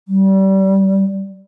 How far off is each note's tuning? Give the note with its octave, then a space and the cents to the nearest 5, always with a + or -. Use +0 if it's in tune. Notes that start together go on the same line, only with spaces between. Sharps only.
G3 -25